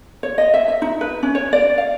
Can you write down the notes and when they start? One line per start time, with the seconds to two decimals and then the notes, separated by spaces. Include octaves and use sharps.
0.23 C#5
0.38 D#5
0.54 E5
0.68 E5
0.82 D#4
1.01 B4
1.23 C#4
1.35 C#5
1.53 D5
1.78 F5